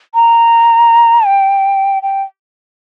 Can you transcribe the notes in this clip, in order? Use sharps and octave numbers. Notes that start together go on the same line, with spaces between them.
A#5
G5
G5